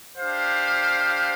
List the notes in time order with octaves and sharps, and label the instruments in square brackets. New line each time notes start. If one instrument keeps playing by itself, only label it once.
[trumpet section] D4 G4 C5 F5